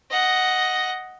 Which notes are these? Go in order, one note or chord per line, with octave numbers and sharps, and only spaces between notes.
D#5 F#5